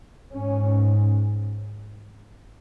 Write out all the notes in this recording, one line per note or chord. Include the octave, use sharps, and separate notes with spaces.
G#2 C#4